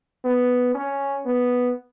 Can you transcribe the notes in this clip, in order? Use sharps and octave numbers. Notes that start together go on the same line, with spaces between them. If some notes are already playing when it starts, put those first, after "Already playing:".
B3
C#4
B3